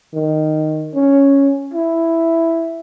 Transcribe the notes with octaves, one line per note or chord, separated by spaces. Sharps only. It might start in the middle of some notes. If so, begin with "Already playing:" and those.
D#3
C#4
E4